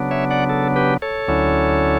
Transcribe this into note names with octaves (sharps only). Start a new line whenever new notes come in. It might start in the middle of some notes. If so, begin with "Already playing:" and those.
Already playing: C#3 F#3 B3 D4
C#5 E5
D5 F#5
A4
G4 B4
A4 C#5
D2 D3 F#3 C#4 E4